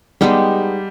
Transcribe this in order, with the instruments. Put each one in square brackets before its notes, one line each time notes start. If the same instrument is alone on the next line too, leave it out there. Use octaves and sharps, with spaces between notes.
[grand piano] G3 [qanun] G#3 B3 D#4 G4